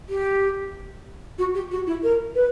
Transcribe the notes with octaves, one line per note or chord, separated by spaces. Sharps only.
G4
F#4
G4
F#4
E4
A#4
B4